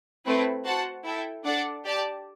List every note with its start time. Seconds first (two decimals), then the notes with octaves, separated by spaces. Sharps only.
0.25 A3 C4 E4 B4
0.65 F#4 C5 F#5 A5
1.04 E4 A4 E5 G5
1.45 D4 A4 D5 F#5 A5
1.84 G4 D5 A5